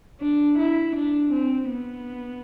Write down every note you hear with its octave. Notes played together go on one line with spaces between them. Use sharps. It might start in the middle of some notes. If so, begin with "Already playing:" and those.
D4
E4
D4
C4
B3